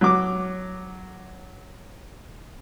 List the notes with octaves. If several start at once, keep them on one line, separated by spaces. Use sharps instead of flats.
F#3 D6